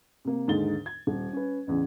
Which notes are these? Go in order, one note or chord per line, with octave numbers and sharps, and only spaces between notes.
C3 A#3
D#2 G#2 D3 D#4 A6 G7
G#6
D#1
C#4 B4
A1 E2 C#3